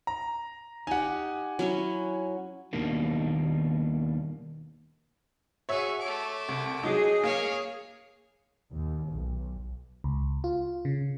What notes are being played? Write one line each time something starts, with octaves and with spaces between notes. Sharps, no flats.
A#5
D#4 G4 F#5 G#5
F#3 C#4 E4
D#2 B2 D#3 G3 A#3 D4
F#4 G#4 C#5 E5
A3 D6
C2
F#3 D#4 G#4
A#3 C#5 F5
D#2
B1
C#2
F4
C#3